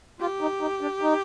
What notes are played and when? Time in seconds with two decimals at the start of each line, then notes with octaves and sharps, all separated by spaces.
0.20 F4 G4
0.41 D#4
0.61 D#4
0.81 D4
1.02 D#4